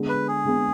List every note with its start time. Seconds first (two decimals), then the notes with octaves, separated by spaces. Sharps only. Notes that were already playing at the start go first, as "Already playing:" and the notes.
Already playing: D3 G#3 B3
0.09 B4
0.28 G#4
0.45 D3 G#3 B3